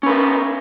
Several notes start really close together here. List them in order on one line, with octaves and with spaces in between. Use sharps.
C#4 B4 A#4